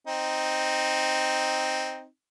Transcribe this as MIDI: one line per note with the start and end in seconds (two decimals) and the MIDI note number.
0.07 2.06 60
0.07 2.06 63